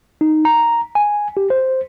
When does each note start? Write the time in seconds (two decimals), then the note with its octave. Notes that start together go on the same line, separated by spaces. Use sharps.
0.21 D#4
0.45 A#5
0.95 G#5
1.37 G4
1.50 C5